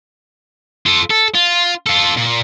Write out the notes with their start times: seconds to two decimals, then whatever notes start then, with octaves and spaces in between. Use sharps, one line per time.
0.86 F4 A4
1.10 A4
1.34 F4
1.86 F4 A4
2.17 A#2